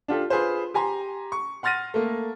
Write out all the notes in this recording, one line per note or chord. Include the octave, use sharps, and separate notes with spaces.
D4 F4 G4 A4
F4 G#4 B4 C5
G4 G#5 A#5 C6
C#6
F#5 C6 F6 A6 A#6 D#7
A3 A#3